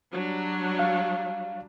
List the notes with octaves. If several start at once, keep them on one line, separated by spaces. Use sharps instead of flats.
F#3 G3 D4
F5